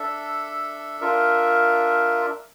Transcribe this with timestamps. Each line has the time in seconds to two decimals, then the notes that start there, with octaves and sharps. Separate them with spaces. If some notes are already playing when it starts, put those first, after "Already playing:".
Already playing: D4 A4 E5
1.01 D4 F4 A#4 E5